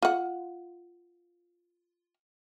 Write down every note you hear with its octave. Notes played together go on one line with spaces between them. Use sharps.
F4 F#5